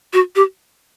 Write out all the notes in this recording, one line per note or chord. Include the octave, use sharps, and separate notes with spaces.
F#4
G4